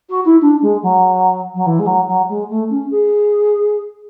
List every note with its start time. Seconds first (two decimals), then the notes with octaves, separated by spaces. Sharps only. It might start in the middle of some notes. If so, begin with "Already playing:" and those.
0.09 F#4
0.25 E4
0.41 D4
0.62 G#3
0.82 F#3
1.54 F#3
1.66 E3
1.79 G#3
1.86 F#3
2.07 F#3
2.29 G#3
2.49 A3
2.70 C#4
2.90 G#4